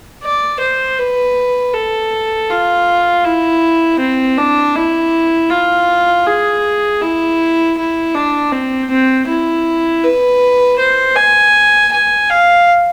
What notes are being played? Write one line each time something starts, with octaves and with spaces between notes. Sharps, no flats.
D5
C5
B4
A4
F4
E4
C4
D4
E4
F4
G#4
E4
E4
D4
C4
C4
E4
B4
C5
G#5
G#5
F5